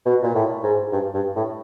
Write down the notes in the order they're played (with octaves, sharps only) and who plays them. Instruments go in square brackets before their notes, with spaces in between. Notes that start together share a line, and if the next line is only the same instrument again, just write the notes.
[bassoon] B2
A#2
A2
G#2
G2
G2
A2